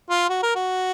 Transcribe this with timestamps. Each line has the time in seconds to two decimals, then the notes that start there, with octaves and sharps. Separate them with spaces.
0.10 F4
0.29 F#4
0.43 A#4
0.56 F#4